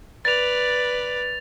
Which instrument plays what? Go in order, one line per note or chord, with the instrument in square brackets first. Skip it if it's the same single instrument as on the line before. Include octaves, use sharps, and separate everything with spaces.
[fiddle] B4 D5 [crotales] A6 F7